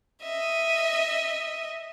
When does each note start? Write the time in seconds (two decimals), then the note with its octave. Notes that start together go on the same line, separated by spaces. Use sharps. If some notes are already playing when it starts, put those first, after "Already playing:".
0.22 D#5 E5